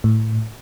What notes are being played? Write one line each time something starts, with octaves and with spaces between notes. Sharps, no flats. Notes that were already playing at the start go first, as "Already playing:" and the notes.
A2